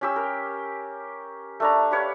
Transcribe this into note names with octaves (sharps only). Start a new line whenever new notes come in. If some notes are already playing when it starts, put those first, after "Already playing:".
C#4 G4 E6
A#4
A3 D4 A#5
G4 B4 C#5 F5